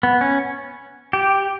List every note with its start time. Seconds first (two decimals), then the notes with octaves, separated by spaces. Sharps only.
0.03 B3
0.21 C#4
1.13 G4